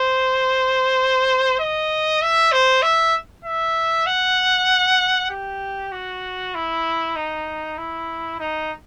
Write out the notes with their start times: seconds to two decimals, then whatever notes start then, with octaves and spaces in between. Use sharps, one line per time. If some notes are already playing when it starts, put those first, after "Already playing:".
Already playing: C5
1.59 D#5
2.22 E5
2.52 C5
2.83 E5
3.45 E5
4.06 F#5
5.30 G4
5.92 F#4
6.55 E4
7.16 D#4
7.78 E4
8.40 D#4